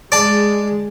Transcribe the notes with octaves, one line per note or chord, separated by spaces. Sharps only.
G#3 D5 A5